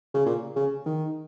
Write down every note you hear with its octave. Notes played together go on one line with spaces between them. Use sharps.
C#3
A#2
C#3
D#3